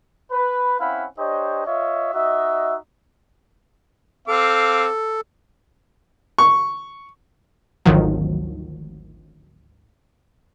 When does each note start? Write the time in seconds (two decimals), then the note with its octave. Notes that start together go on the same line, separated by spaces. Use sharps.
0.32 B4
0.80 C4 C#4 E4 F5 F#5 B5
1.18 D4 G4 C5 C#5 D#5
1.67 F4 C#5 D#5 E5
2.14 D#4 F#4 D#5 E5
4.28 C4 A4 F5 D6
6.38 C#6
7.85 G#1 D2 D#3 F3 F#3